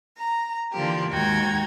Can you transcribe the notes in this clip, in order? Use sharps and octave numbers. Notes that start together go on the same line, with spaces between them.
A#5
D3 E3 F3 A#3 G4
D#2 G#2 F#4 G5 A#5 G#6